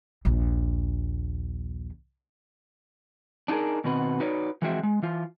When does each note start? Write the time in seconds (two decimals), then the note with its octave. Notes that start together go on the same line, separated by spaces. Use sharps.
0.25 A#1 D#2
3.48 D4 D#4 F4 G#4 A#4
3.84 B2 D#3 C4 F#4 B4
4.20 D#4 F#4 B4 C#5 D5
4.62 E3 F3 G#3 C4 F#4 E5
4.83 G#3
5.02 E3 F4